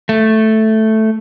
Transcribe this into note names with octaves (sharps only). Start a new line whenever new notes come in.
A3